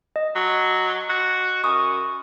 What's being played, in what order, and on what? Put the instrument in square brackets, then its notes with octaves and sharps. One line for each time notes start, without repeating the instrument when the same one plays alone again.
[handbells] D#5
[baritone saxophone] F#3
F#4
[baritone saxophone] F#2 [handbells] C#6 D#6